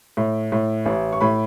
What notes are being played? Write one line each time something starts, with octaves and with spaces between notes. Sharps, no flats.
A2
A2
A1
C#6
A2 B5